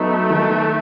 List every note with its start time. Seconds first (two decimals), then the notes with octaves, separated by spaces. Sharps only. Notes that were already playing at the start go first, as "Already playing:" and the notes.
Already playing: F#3 A3 B3 D#4
0.30 D#3